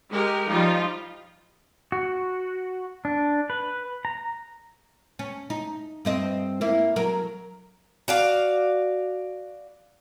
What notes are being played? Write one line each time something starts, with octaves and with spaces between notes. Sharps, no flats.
G#3 G4 A#4
F3 G3 D#4 F4
F#4
D4
B4
A#5
C#4
D#4
G2 C4 D#5
A#3 E4
F#3 A#4
F#4 D5 F5